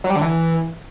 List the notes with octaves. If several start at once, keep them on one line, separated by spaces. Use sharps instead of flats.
F#3
G3
D3
E3